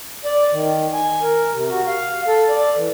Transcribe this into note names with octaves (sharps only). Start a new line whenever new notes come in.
D5
D#3
G#5
A#4
C3
F#4
F5
A4
D5
E3